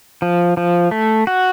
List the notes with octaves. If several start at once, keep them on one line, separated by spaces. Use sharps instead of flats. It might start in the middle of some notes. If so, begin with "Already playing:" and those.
F3
F3
A3
F#4